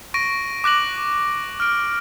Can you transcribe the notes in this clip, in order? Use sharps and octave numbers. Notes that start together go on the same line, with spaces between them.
C#6 A#6 D7 D#7
D6 F#6 A#6 F#7
F6 D7